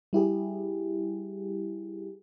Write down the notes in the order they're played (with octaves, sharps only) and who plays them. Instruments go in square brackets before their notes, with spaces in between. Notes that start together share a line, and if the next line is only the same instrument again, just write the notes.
[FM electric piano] G3 E4 G4 G#4